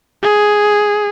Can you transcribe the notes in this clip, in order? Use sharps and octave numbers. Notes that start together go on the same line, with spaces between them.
G#4